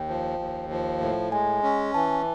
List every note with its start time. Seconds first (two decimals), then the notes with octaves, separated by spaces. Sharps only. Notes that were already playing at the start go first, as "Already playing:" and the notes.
Already playing: D#2 G5
0.08 F3
0.39 D#2
0.70 F3
1.01 A2
1.32 G#3 G#5
1.63 C#4
1.94 E3 A5